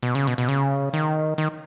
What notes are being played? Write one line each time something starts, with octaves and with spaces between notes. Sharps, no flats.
B2
C#3
B2
B2
C#3
D#3
D#3